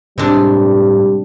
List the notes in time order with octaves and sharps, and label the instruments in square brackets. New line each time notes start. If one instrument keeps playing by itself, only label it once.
[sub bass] A2 [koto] C3 G#3 D4 [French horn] G3